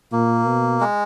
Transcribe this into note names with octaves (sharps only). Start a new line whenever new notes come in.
A#2 A#3
B2
G#3